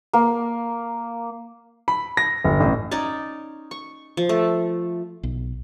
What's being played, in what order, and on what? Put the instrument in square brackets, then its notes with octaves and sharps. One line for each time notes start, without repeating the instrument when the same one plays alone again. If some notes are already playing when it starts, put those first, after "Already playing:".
[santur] A#3
[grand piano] B5
A#6
G1
A1
[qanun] C#4 D#4 D5
C#6
F3
A3
[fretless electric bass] B1